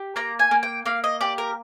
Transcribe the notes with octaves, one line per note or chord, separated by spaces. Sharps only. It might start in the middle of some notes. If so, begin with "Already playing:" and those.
Already playing: G4
A#3 A#5
G#5
A#3
G5
A#3 F5
D#5
G4 D5
A#4